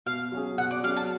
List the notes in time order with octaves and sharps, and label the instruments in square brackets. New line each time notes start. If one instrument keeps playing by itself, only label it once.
[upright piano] B2 [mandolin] F5
[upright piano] F#3 C#4 G#4
[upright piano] B2 [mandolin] F#5
[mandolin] D5
[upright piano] F#3 C#4 G#4 [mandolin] F5
[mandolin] A5